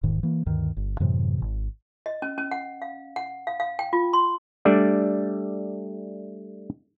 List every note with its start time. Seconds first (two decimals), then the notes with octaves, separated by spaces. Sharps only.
0.03 E1 G#2 D#3
0.23 E3 A#3
0.46 D2 G2 D#3
0.77 G1
1.00 F#2 A2 C3 E3
1.42 G#1
2.06 D#5
2.22 C#4
2.38 C#4
2.51 F#5
2.82 F5
3.16 F#5
3.47 F5
3.60 F5
3.79 G5
3.93 F4
4.13 C6
4.65 G3 A3 D4 D5